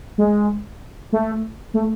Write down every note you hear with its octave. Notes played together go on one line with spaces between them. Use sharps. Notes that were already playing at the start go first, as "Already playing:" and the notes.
G#3
A3
A3